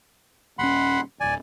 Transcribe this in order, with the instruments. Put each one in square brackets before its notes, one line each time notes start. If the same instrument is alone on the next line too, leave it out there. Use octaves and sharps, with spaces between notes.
[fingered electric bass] D#1 C#4 [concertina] F#5 B5 C6
[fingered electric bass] D1 G1 [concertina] D5 G#5